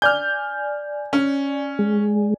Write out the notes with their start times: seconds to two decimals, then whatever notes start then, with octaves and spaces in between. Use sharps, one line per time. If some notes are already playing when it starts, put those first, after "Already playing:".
0.02 D5 G#5 F6 G6
1.13 C#4
1.79 G#3